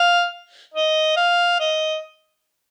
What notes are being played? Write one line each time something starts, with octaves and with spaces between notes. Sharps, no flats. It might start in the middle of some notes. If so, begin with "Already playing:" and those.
Already playing: F5
D#5
F5
D#5